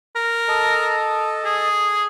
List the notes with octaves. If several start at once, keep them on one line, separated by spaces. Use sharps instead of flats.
A#4
A4 D#5 A5
G#4